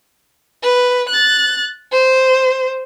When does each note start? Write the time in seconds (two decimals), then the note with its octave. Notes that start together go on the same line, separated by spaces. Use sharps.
0.63 B4
1.10 F#6 A6
1.92 C5